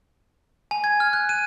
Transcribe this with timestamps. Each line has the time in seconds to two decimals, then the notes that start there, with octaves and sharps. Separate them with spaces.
0.71 G#5
0.84 G#6
1.00 F6
1.13 F#6
1.29 D#7